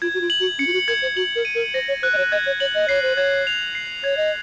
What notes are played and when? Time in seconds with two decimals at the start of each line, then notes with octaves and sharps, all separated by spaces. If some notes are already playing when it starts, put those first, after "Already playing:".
0.02 F4 G#6
0.14 F#4
0.21 F4
0.30 F#7
0.40 F#4
0.59 C#4 C#7
0.67 F4
0.73 F#4
0.88 A#4 G#6
1.02 C5
1.16 F#4 F#7
1.36 A#4
1.45 D#7
1.55 A#4
1.74 C5 A#6
1.88 C#5
2.03 C5 F#6
2.13 D#5
2.18 C#5
2.32 D#5 G#6
2.46 C#5
2.60 C#5 F#7
2.75 D#5
2.88 C#5 C7
3.02 C5
3.16 C#5 G#6
3.47 F7
3.75 C7
4.04 C#5 G#6
4.17 D#5